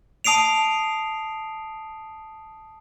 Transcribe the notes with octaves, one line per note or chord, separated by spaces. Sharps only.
A5 D#6 C7 D7 F7